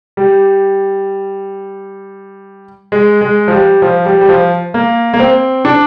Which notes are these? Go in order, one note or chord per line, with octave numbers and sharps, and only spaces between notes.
G3
G#3
G#3
F3
G3
F3
G3
G3
F3
A#3
A#3
C4
D4